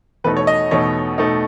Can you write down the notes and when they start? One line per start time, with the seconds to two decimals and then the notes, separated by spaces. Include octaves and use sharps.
0.24 E2 B2 A3 D#4 B4
0.37 C#5
0.47 D#5
0.71 E2 B2 A3 D#4 C#5
1.18 B2 A3 D#4